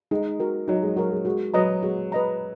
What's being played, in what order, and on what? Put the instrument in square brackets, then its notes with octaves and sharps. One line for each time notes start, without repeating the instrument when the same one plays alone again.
[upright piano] G#3 [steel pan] D#4
[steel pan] F#4 A#4
[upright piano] F#3 [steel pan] D#4
[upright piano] G#3
[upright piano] F#3 [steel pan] F#4 A#4
[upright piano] G#3
[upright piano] G#3 [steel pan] F#4
[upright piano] F#3 [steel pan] B4 D#5 A#5
[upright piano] G#3 [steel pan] F#4
[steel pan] B4 D#5 A#5